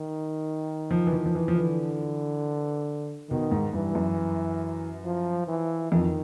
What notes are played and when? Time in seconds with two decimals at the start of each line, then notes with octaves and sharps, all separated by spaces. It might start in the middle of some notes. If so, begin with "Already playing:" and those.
Already playing: D#3
0.91 F3
1.07 E3
1.13 F3
1.26 F3
1.35 E3
1.48 F3
1.56 D3 E3
3.30 B2 D#3
3.51 G#2
3.73 G2 E3
3.95 F#2
5.04 F3
5.47 E3
5.92 F2 D#3